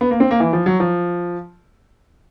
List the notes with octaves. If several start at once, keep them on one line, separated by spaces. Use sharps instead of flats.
B3
A#3
C4
A#3
E3
F3
F#3
F3